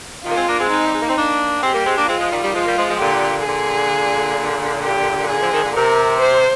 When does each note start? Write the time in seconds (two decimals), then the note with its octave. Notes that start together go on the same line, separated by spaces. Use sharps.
0.23 C3 D#3 F4
0.30 A#3
0.35 G#3 C4
0.47 A#3 D4
0.58 G#3 C4
0.70 D#4
0.85 G3
0.93 G#3
1.01 A#3
1.08 C4
1.16 A#3 D4
1.61 G#3 C4 G4
1.73 G3 A#3
1.85 G#3 C4
1.96 A#3 D4
2.07 G#3 C4 F4
2.19 F3 G#3
2.30 D#3 G3
2.42 D#3 G3
2.53 F3 G#3 F4
2.65 G3 A#3
2.76 F3 G#3
2.88 F3 G#3
2.99 A#2 D3 G4
3.45 A#2 D3 G#4
4.83 G4
5.29 G#4
5.41 D3 F3
5.52 C3 D#3
5.63 A#2 D3
5.75 C3 A#4
6.21 C5